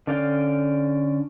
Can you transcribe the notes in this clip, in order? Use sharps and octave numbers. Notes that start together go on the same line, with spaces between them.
D3 C#4 D5 F5 G5